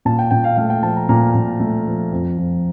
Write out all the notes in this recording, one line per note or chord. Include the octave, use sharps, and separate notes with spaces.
A#2 A5
G5
A#2 G5
F5
A3 F5
G5
F3 A5
A#5
A#2 A#5
A#2
A3
F3
F2
F2